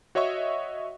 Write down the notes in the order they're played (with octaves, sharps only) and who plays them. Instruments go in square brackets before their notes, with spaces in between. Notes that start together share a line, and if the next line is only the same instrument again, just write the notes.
[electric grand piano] F#4 C#5 D#5 E5 C#6